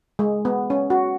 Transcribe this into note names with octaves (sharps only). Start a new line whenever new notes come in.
G#3
B3
C#4
F#4